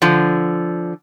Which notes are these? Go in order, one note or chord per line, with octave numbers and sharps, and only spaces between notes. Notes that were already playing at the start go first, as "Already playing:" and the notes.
D3 F3